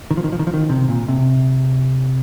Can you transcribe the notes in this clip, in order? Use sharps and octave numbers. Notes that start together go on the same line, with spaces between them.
D#3
F3
D#3
F3
D#3
F3
D#3
C3
A#2
C3